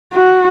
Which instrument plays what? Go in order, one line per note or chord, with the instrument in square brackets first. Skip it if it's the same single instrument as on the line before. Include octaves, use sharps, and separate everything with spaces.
[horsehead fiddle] F#4